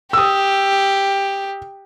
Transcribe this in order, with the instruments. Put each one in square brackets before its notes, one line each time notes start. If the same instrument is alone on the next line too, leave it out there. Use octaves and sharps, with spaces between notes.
[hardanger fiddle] G4 [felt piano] D#6 E6